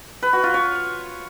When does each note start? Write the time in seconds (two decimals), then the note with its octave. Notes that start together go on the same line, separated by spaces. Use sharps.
0.22 B4
0.33 F#4
0.44 F4
0.54 C#5